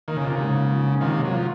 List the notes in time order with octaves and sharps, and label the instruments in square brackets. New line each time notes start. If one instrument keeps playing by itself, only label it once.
[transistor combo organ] D#3 [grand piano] A#3
[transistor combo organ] C#3
[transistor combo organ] C3 [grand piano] F4
[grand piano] G#2 [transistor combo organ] C#3
[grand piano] F4
F3
G#2
[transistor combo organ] C3 D#3 [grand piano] F4
[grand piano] A#3
[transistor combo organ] F#3
[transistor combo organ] F3 [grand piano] F4